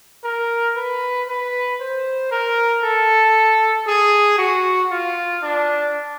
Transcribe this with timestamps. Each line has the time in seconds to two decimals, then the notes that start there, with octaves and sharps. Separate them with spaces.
0.24 A#4
0.76 B4
1.28 B4
1.80 C5
2.31 A#4
2.83 A4
3.87 G#4
4.38 F#4
4.91 F4
5.43 D4